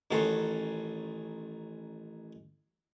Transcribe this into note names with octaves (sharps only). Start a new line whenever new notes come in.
A1 D#3 C#4 F#4 A4 C6